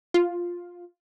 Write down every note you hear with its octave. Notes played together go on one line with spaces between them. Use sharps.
F4